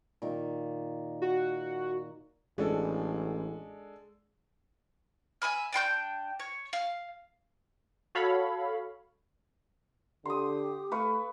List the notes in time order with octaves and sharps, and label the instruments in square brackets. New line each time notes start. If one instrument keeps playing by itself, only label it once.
[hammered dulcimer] A#2 D#3
[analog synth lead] F#4
[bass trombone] A1 [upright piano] G#3 D4 A4 [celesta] G#4
[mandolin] E5 G#5 B5 F6
D4 G5 C6 G6
C#5
F5
[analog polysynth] F#4 A4 C#5 F5 B5
[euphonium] D3 [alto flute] G4 [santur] C6 D#6
[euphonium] A3 [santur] B4 F5 C#6